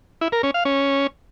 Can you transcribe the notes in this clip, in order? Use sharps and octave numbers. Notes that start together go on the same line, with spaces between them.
E4
A#4
C#4
F5
C#4